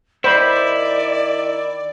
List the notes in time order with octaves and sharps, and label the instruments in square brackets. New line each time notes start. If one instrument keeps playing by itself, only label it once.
[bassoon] D#3 [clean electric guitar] E4 [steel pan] C5 B5 [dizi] D5